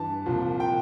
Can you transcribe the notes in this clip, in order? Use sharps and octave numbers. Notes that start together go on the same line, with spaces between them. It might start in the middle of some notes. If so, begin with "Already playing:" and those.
Already playing: G2 E3 A5
C2 A#2 F3
G5